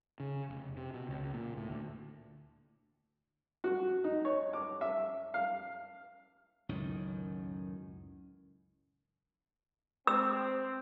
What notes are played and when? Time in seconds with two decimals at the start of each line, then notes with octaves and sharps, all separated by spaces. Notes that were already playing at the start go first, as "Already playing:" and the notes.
0.20 C#3
0.50 F1
0.77 C3
0.93 B2
1.09 C#2
1.34 A#2
1.57 A2
1.70 D2
3.64 F#4
4.04 D#4
4.25 C#5
4.53 D6
4.81 E5
5.34 F5
6.69 C#2 F#2 A2 D#3
10.07 C4 E6